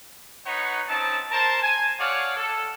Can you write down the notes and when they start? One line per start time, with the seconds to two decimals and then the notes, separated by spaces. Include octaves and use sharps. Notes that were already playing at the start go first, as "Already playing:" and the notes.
0.46 D#4 B4 C#5 F#5
0.88 C4 C#4 D#4 A5
1.31 A#4 C5 A5
1.62 G#5
1.99 G#4 C#5 D5 F5 F#5
2.37 A4